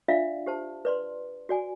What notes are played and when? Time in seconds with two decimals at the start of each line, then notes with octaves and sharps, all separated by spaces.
0.08 D4 F4 D5 E5 F5 B5
0.46 G4 C5 A5
0.85 B4 D5 C6
1.49 F#4 D5 G#5